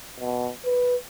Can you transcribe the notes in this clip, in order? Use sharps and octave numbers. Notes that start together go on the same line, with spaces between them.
B2
B4